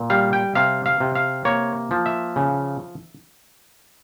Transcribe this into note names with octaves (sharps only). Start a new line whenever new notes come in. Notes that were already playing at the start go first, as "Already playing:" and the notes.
Already playing: A#2
G3 F5
G5
C3 F5
F5
C3
F5
A#3 C#5
F3
E5
C#3